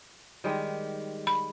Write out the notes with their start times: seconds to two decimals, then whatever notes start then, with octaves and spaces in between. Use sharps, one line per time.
0.44 D#3 G3 G#3
1.27 B5